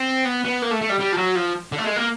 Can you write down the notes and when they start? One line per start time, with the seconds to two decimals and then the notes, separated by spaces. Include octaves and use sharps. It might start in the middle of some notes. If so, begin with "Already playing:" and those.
Already playing: C4
0.25 B3
0.45 B3
0.62 A#3
0.71 A3
0.81 A3
0.89 G3
0.99 G3
1.12 F3
1.17 F#3
1.35 F3
1.72 D3
1.78 A3
1.84 G#3
1.96 A#3